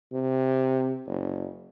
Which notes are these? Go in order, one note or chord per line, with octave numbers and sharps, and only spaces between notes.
C3
F#1